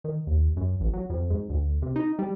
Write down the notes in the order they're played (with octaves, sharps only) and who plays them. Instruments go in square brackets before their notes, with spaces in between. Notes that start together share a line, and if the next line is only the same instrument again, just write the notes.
[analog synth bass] D#3
D#2
F#2
A1
F#3
F2
G#2
D2
C3
D#4
G3